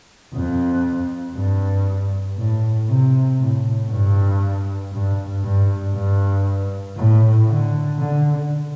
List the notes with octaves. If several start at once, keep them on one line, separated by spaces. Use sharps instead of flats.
F2
G2
A2
C3
A2
G2
G2
G2
G2
A2
D3
D3